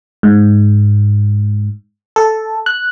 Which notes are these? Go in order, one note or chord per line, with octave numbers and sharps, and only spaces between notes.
G#2
A4
F#6